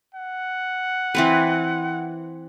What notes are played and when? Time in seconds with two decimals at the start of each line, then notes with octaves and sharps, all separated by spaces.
0.15 F#5
1.15 E3 C4 B4